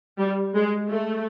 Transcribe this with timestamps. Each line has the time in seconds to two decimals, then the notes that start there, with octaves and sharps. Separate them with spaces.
0.18 G3
0.54 G#3
0.89 A3